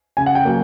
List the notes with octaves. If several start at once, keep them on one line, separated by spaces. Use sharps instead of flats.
C#3 G#5
F#5
G5
F#3 A#3